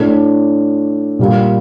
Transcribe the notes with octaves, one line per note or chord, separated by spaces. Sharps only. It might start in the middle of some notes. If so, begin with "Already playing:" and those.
Already playing: A2 A3 D4
A#2 G3 A#3